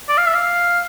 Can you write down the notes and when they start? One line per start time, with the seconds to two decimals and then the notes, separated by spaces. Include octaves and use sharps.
0.09 D5
0.17 F5
0.26 E5
0.34 F5